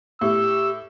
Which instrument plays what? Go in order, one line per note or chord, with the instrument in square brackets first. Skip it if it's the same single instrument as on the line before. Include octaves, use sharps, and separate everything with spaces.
[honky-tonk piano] A2 [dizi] G4 [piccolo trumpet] E6